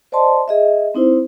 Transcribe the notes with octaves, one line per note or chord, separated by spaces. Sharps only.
C5 D5 D#5 A5 C6
G#4 D#5 E5
C4 D#4 E4 C5